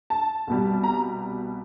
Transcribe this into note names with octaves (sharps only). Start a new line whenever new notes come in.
A5
C2 B2 G3
A#5